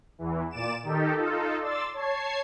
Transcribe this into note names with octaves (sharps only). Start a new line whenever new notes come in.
E2 E3
A#2 D5 D6 E7
D#3 D#4 G4 A4
D#4 F4 A4
D5 C6 E6 A6
C#5 A5 G#6 C7